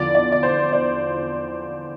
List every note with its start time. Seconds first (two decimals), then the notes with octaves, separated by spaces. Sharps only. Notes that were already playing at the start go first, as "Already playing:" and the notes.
Already playing: E2 D3 F3 D5
0.15 D5
0.32 D5
0.43 C5
0.73 D5